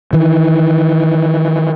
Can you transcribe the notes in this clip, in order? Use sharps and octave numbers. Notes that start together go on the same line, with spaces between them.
D#3 E3